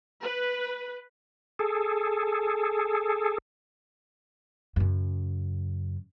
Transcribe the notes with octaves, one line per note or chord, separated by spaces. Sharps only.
B4
G#4 A4
F#2 C#3